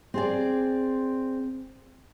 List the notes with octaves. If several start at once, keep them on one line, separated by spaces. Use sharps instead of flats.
C4 G#4 D5